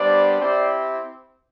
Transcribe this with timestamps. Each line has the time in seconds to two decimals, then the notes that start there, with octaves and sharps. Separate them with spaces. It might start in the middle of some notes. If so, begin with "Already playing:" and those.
Already playing: G3 B3 D4 C5 D5
0.39 C4 E4 G4 C5 D5